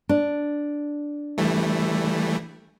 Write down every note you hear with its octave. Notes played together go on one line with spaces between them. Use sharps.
D4
E3 G3 A3